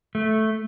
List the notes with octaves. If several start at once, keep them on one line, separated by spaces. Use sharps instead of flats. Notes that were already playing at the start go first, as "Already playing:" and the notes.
A3